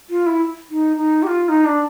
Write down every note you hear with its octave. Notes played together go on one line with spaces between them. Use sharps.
F4
E4
D#4
D#4
G4
F4
D#4
D4